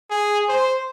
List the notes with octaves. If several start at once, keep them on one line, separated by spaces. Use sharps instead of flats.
G#4
C5